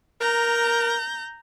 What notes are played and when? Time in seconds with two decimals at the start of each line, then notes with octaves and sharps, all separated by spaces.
0.21 A#4 A#5 G6